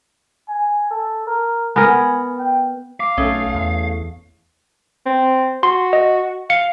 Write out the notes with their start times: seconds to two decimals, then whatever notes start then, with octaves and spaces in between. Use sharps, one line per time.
0.48 G#5
0.91 A4
1.27 A#4
1.76 B3 A#4 G#5
2.39 G5
3.00 F5 D6
3.17 B1 A3 C#4 A4 D#6
3.54 E2
5.06 C4
5.63 F#4 C6
5.93 D#5
6.50 F5 C#7